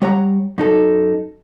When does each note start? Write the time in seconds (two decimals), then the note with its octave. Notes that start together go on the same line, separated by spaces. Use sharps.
0.02 G3 C#5 F#5 A#5
0.58 F#2 D#4 A4